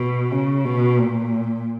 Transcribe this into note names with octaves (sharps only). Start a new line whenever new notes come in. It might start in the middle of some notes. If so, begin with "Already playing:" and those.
Already playing: B2
C#3
B2
A#2